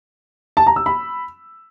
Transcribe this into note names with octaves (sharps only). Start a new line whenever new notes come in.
A5
A#5
E6
B5